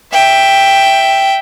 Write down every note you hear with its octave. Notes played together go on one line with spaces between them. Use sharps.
E5 G5